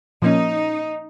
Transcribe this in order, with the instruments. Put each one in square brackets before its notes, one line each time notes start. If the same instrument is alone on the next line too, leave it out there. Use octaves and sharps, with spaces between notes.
[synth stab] A#2 F3 A#3 C#4 [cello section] D#4